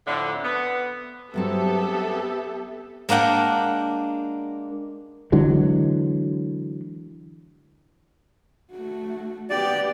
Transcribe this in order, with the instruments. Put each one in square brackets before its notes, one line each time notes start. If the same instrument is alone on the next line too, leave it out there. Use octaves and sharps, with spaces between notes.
[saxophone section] F2 A2 D3
B3
[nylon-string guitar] G2 F#3 C4 [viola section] B3 G4 E5 [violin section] A4
[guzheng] G#3 A#3 D4 F#5 G5
[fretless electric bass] D3 E3 F#3 G#3
[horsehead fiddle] A3 F#4
[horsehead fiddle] B3 G4 [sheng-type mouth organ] D5